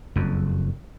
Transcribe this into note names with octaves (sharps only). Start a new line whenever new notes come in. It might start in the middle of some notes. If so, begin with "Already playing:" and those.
F#1 F2